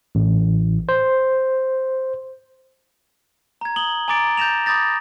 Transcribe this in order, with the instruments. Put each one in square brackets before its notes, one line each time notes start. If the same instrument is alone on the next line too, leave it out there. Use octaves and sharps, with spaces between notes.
[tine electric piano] A1
C5
[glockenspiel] A#5 G#6
D#6 F#7 G7
G#5 A#5 D6 A6 D7
G6 A6 A#6 E7 F7
B5 D6 D#6 G6 A6 A#6